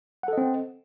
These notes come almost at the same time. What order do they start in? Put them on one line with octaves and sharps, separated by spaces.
F#5 A4 D#5 C4